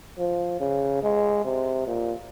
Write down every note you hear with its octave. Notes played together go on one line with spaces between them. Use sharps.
F3
C#3
G#3
C3
A#2